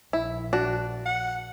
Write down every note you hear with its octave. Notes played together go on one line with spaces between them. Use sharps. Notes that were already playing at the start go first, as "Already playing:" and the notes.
A#1 E4
D4 F#4
F#5